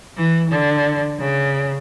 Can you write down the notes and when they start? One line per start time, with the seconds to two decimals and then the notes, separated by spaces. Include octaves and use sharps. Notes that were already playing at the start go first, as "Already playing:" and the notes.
0.17 E3
0.51 D3
1.19 C#3